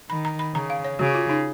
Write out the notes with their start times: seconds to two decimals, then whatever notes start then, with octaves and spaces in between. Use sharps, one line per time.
0.09 D#3 B5
0.25 A#5
0.39 B5
0.54 C#3 A#5
0.70 F5
0.84 C#5
0.99 C#3 F#4
1.15 F4
1.29 D#4